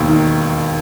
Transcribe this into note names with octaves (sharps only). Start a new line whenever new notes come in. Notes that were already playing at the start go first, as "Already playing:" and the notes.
Already playing: E1 D#2
D#3